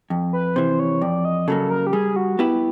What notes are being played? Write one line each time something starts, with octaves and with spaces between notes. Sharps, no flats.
F2
B4
C3 E3 C5
C#5
F2 D5
D#5
C#3 F#3 A#3 A4
A#4
G4
G3 G#4
F#4
B3 E4 G4 B4